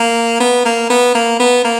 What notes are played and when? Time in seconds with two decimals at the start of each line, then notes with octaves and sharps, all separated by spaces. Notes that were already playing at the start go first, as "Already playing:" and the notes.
Already playing: A#3
0.40 B3
0.65 A#3
0.90 B3
1.15 A#3
1.40 B3
1.65 A#3